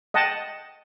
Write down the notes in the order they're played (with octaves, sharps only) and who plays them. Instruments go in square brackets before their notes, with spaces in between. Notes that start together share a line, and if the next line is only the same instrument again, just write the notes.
[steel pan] D#5 F#5 G5 A5